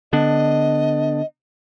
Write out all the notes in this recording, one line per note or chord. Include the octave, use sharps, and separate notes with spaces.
D3 B3 D4 D#5